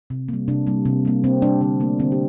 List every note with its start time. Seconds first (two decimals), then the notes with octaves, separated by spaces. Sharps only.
0.10 C3
0.29 G3 A#3
0.48 C3 D4
0.67 G3 A#3
0.85 C3
1.05 G3 A#3
1.24 C3 C4
1.42 G3 A#3 D4
1.61 D3 C4
1.80 A3 A#3
2.00 D3 C4
2.12 G4